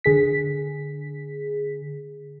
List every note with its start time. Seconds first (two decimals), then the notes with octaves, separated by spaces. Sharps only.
0.04 D3 G#4 B6